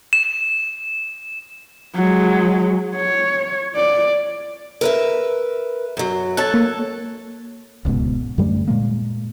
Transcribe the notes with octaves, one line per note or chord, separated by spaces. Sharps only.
E7
F#3 G#3
C#5
D5
A#4 B4 E5
F#2 F#3
A4 C#5 A5 F#6 A6
A#3
D1 C#2 G#2 B2
F#2 D3 G3 A3
A#2 G#3 A#3